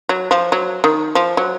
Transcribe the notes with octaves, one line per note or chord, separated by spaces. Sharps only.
F#3
F3
F#3
D#3
F3
F#3